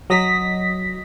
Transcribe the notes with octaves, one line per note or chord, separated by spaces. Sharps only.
F#3 D#5 A#6 B6